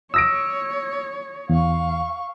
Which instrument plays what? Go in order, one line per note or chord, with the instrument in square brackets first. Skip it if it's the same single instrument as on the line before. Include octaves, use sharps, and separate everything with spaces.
[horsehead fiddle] C#5 [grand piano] D#6 A#6 D7 [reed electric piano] E6
[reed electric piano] E2 [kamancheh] F5 C#6